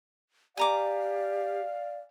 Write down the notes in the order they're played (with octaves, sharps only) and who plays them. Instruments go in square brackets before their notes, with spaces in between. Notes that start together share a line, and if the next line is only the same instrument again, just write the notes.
[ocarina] G4 [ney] D5 [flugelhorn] F5 [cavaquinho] G#5 A#5 D6